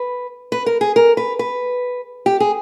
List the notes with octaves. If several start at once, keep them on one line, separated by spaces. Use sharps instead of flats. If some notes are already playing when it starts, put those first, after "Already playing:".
Already playing: B4
B4
A#4
G#4
A#4
B4
B4
G4
G#4